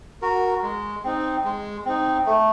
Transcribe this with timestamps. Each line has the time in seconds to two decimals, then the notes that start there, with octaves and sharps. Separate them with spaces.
0.22 F#4 A#4
0.63 G#3
1.04 C4 D#4
1.44 G#3
1.86 C4 D#4
2.26 A3